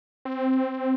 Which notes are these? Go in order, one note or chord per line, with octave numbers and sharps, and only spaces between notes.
C4